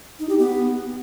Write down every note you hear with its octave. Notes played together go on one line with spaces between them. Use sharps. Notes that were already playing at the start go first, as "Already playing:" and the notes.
D#4
G4
B3